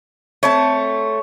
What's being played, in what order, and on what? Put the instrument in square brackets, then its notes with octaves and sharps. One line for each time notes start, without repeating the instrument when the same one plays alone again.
[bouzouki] A3 C4 A5 [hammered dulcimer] C#5